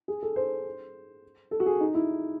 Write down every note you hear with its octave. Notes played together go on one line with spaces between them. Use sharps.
G#4
A4
C5
A4
F#4
G#4
D#4
E4